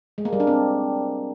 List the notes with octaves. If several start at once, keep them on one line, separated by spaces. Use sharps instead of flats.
G#3
A#3
G3
D4
C4